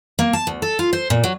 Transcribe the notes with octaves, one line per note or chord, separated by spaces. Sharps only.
A#3
A5
D2
A4
F4
C5
A#2
F#3